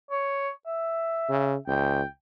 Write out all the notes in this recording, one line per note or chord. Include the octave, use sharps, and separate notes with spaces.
C#5
E5
C#3
C#2 G5